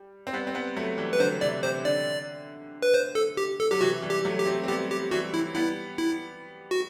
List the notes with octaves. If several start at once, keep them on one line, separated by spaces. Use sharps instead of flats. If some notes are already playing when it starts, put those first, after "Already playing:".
Already playing: G3
C4
G3 B3
C4
G3 B3
F#3 A3
E3 G3
B4
D3 F#3 C5
C3 E3 D5
C3 C5
D3 D5
B4
C5
A4
G4
A4
F#3 G4
C3 E3 F#4
E3 G3
G4
F#3 A3
G4
A3 C4
C4
G3 B3 G4
G4
E3 G3 F#4
E4
G3 B3 E4
E4
F#4